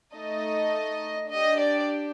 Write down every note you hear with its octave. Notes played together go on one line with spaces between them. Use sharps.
A3 D#4 A4 D#5
D4 G4 D#5
D5